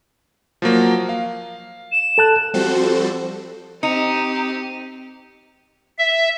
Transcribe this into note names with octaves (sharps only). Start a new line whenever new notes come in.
F3 F#3 A#3
F5
E7
A4 A5 F#6
F3 G3 C4 F#4 A4 C5
C4 D#4 G4 C#7 D#7 F7
E5